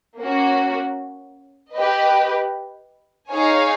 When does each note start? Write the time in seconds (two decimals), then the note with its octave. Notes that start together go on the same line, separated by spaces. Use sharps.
0.18 A#3 C#4 F#4
1.73 G4 B4 D#5
3.30 D#4 G#4 C#5 F5 G#5